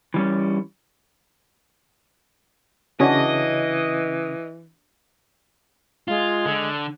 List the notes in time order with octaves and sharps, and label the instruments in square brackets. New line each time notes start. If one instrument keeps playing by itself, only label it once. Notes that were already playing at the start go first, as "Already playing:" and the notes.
[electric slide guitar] E3 G3 C#4
[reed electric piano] C#3 C#4 D#6 [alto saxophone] E3 [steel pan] D4 F#4 C#6 [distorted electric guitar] D#5
[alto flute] G#3 [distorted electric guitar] F4
[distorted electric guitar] D3